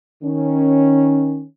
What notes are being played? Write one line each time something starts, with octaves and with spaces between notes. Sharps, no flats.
D#3 C#4